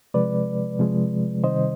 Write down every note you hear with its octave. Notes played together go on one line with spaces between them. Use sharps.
C3 F3 G#3 B4 D5
C3 F3 G#3
C3 D#3 G3 C5 D#5